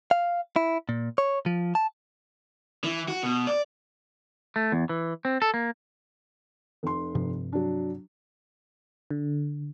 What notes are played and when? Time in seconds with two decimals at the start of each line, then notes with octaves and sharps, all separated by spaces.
0.11 F5
0.56 E4
0.89 A#2
1.18 C#5
1.46 F3
1.75 A5
2.84 E3
3.08 F#4
3.23 B2
3.47 D5
4.56 A3
4.72 E2
4.89 E3
5.25 C4
5.42 A4
5.54 A#3
6.83 F1 C6
7.15 G2 C3 F3
7.53 F#3 D4
9.11 D3